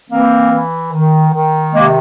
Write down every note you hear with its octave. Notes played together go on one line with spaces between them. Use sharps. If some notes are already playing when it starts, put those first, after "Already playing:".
E3 A#3 C4
E3
D#3
D#3
C3 G#3 A#3